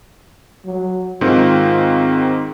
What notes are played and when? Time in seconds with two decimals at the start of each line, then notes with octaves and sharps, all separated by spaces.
0.65 F#3
1.21 G#2 D#3 C4 F4